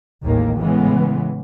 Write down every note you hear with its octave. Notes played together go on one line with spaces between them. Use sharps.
A1 D#2 A2 D#3 G#3 A#3
A2 C#3 E3 G#3 B3